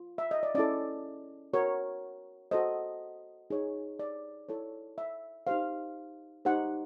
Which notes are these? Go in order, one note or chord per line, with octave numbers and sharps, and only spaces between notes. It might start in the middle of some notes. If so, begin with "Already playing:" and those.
Already playing: F4
E5
D#5
D5
C#4 E4 A4 D5
F#4 A#4 C#5
F#4 A4 C5 D#5
D#4 G#4 C#5
D5
E4 A4 C#5
E5
D#4 G4 C5 F5
D#4 G4 C5 F#5